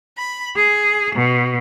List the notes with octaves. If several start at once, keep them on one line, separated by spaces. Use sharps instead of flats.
B5
G#4
B2